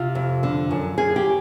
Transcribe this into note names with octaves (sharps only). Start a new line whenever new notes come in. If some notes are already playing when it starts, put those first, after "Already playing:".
Already playing: C3 F4
F2
D3
F#2
F#2 G#4
G4